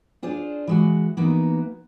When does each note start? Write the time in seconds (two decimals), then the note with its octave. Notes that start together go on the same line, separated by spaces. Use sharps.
0.23 D4 F4 G#4 C5 D5
0.67 E3 G#3 F#4
1.17 E3 A#3 B3 D#4 F#4